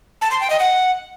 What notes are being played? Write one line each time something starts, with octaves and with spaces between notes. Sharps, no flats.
A5
C6
G5
D#5
F#5